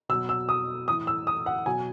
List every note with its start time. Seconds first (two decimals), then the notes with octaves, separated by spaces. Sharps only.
0.09 B2 F#3 E6
0.29 E6
0.49 D#6
0.88 A2 E3 D#6
1.07 E6
1.27 D#6
1.46 F#5
1.66 B2 F#3 G#5